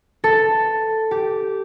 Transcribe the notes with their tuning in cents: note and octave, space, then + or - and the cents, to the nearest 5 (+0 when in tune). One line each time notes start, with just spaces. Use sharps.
A4 +5
G4 -10